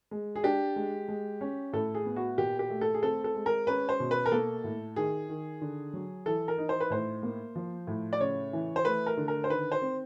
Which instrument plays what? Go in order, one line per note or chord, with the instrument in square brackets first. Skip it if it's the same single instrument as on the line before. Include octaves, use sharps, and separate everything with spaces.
[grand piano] G#3
G#4
D4 G4
G#3
G#3
C#4
A2 A4
G#4
B3
F#4
A#2 G4
G4
A3
A4
G#4
C4 A4
A4
G#3
A#4
C#4 B4
C5
B2
B4
A#4
A#3 A4
A2
D#3 G#4
D#3
D3
F#3
E3 A4
A#4
D#4
C5
B4
A2 C5
A#3
F3
A2
D5
C#3 C#5
E3
C5
A3 B4
A#4
D3
A#4
C5
D#3 B4
C5
C4